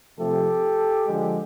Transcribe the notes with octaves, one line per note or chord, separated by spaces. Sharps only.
C3 F3 A3 G4 A4
D3 F3 G#3